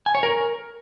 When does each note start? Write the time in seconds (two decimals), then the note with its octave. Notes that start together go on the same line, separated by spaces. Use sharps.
0.06 G#5
0.15 C#5
0.23 A#4